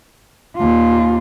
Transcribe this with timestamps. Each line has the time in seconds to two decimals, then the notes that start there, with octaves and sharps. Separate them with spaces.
0.57 D#2 F4